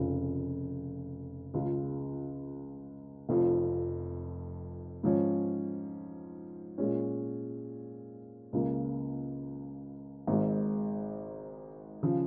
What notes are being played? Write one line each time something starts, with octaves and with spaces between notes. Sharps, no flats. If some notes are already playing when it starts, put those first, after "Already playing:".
Already playing: F1 F2 C#3
C#2 C#3 G#3 F4
F1 F2 F3
G#2 F3 C#4
A#2 G#3 C#4
C#2 C#3 A#3
G#1 G#2 G#3
C#3 F3